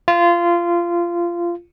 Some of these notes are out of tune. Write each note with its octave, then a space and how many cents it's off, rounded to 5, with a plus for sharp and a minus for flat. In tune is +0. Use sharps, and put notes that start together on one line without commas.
F4 -20